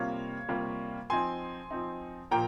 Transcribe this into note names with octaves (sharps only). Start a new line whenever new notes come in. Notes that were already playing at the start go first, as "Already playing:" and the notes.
Already playing: C3 G3 A#3 F4 C#5 F5
C3 G3 A#3 F4
F3 C4 D#4 G#5 C6
F3 C4 D#4
A#2 F3 A#3 G5 A#5